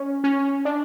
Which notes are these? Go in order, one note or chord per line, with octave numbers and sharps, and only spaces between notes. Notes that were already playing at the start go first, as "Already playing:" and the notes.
Already playing: C#4
C#4
D4